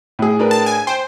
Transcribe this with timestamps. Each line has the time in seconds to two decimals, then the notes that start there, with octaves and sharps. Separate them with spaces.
0.19 A2 G#4
0.39 D4 A#4 B4
0.51 A5
0.66 G#5
0.87 C5 G5